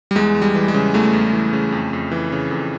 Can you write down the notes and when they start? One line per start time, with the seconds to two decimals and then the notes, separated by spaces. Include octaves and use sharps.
0.11 G3
0.15 E2 G#3
0.35 E2
0.42 G3
0.55 E3
0.68 G#3
0.74 C#3
0.94 E2 A3
1.13 E2
1.33 E3
1.53 C#3
1.72 F2
1.93 F2
2.11 E3
2.32 C#3
2.51 F2